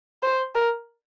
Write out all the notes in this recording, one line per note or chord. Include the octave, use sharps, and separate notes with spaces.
C5
A#4